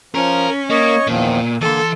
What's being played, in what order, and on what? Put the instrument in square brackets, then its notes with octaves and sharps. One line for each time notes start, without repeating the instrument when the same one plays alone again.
[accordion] F3 [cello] C#4 [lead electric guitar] A#4
[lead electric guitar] A#3 [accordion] C#5 D#5 C#6
[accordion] E2 D#3 F3 [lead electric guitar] A#2
[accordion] D3 A#3 [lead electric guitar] E3 C6 [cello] A4